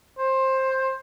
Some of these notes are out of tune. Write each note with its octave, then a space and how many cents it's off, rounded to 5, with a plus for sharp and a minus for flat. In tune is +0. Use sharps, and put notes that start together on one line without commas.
C5 +15